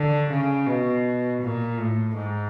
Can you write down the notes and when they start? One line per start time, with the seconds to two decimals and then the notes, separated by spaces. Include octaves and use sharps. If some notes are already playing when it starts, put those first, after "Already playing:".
Already playing: D3
0.30 C#3
0.67 B2
1.41 A#2
1.78 A2
2.16 G#2